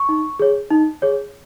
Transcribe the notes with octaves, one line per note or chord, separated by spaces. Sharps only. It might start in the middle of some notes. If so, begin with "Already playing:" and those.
Already playing: C#6
D#4
G#4 C#5
D#4
G#4 C#5